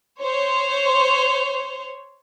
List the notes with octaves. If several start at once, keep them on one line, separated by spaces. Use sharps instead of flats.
C5 C#5